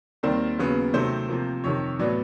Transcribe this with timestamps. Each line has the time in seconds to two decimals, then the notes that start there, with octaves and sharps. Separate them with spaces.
0.23 D#2 D#3 G3 C4 A#4
0.58 D#2 C#3 F#3 B3
0.94 C3 D#3 F#3 A3 C4 C5
1.28 C3 F3 A#3
1.64 F2 C3 D#3 C#5
1.99 A2 F#3 B3 D5